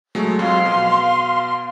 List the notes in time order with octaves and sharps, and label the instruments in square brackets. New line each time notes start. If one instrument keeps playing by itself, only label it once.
[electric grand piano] F#3 G#3 A3
[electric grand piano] F2 F#3 [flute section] F5 C6
[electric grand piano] B2